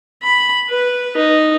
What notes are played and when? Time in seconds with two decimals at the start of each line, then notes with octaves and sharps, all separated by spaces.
0.22 B5
0.70 B4
1.17 D#4